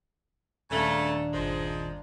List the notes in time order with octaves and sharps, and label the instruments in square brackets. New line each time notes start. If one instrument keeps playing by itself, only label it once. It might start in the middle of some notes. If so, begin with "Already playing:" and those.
[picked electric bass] D#1 [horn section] C#3 A3 [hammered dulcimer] A#3 D4
[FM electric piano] G1 C5 [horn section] F3 G#3